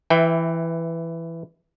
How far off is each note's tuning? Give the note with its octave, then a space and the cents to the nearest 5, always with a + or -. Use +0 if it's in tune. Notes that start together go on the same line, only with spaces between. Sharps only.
E3 +10 E5 -10 G5 +20